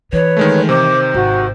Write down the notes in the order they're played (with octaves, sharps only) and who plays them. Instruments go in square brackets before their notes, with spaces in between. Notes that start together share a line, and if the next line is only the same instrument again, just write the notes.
[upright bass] E3 [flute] B4 [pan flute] C#5
[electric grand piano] D#3 G#3 A3
[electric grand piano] C3 D#3 [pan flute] C5 [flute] D6
[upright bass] G#1 [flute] F#4